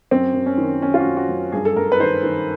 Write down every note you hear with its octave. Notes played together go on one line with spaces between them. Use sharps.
F#2 C4
F#2
C#4
D#3
D#3 C#4
F4
F#4
F#2
F#4
F#2
G2 G#4
A4
G2 A#4
B4
D#3 C5
D#3